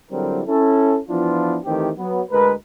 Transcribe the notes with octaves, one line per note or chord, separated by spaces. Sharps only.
D3 F#3 G3 C4 E4 A#4
C#4 E4 A4
E3 F3 B3 D4 E4 F4
D#3 E3 A3 C4 G4
F#3 B3
D2 G#3 A#4 B4